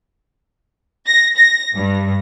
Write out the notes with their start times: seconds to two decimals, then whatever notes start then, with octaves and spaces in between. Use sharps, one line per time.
1.07 A#6
1.37 A#6
1.76 G2